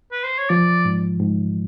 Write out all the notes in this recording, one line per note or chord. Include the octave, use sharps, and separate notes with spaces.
B4
C5
C#5
F3 D5
G#2
G#2